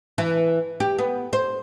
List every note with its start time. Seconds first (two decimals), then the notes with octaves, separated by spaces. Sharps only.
0.18 E3
0.80 G4
0.98 B3
1.33 C5